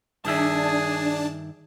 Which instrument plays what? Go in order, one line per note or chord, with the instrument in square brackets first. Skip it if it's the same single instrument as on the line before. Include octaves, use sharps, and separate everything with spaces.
[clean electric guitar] G2 D#3 E5 [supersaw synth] D4 A5 [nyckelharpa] G#4